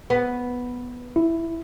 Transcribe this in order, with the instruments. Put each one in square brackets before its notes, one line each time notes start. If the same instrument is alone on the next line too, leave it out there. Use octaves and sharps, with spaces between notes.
[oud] B3
[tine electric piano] E4